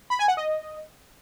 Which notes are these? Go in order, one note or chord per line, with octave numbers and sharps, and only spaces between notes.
B5
G#5
F#5
D#5